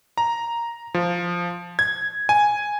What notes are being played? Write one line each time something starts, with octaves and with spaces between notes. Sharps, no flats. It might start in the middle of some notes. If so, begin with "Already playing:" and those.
A#5
F3
G#6
G#5